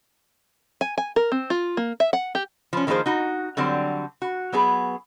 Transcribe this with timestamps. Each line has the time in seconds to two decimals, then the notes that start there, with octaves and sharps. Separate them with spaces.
0.81 G#5
0.98 G#5
1.16 A#4
1.32 C4
1.50 F4
1.77 A#3
2.00 E5
2.13 F#5
2.35 G4
2.73 F3 C#4
2.87 D#3 F3 A#3 C#4 G#4 C5
3.06 D#4 F#4
3.57 D3 F#3 G3 C4
4.22 F#4
4.52 F#3 B3 G#4